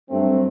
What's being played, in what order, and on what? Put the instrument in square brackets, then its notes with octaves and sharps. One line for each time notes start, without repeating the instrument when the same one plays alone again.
[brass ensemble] G2 F#3 A3 C4